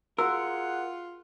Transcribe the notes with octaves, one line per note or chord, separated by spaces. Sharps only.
F4 F#4 G#4 A#4 F#5 E6